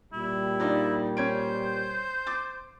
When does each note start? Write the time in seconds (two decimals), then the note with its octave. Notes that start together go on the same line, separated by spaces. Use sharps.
0.13 A#2 G3 E4
0.60 D4 D#4 F4
1.17 C#4 C5 G#6 D7
2.27 D6 A6